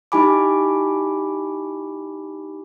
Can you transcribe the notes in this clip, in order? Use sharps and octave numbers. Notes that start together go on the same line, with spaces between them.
D#4 E4 G4 G#5 B5 D6